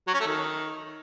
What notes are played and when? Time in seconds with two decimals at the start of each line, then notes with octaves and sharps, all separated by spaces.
0.07 F#3
0.14 C#4
0.20 A3
0.27 D#3